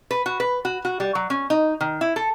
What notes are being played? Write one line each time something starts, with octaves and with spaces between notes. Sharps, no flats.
B4
F#4
B4
F#4
F#4
G3
F#3
C#4
D#4
D#3
E4
A4